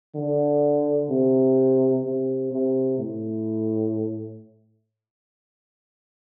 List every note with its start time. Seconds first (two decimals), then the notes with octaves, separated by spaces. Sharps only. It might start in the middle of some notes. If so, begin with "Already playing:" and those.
0.15 D3
1.10 C3
2.04 C3
2.51 C3
2.98 A2